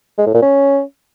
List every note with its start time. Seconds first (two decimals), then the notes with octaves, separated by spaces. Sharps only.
0.18 G#3
0.26 A2
0.34 A#2
0.42 C#4